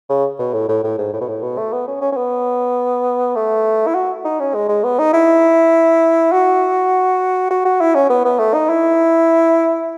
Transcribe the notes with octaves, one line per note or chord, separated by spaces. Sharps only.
C#3
B2
A2
A2
A2
G#2
A2
B2
A2
B2
A3
B3
C#4
C#4
C#4
B3
A3
E4
F#4
D#4
C#4
G#3
G#3
B3
D#4
E4
F#4
F#4
F#4
E4
C#4
B3
B3
A3
D#4
E4